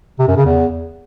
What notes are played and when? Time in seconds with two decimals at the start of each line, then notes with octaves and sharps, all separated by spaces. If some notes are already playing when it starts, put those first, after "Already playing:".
0.19 C3
0.28 F#2
0.37 C#3
0.45 E2